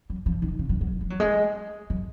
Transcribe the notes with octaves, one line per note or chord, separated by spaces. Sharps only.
F#3
F3
D#3
C#3
F#3
F#3
G#3
F#3
G#3
F#3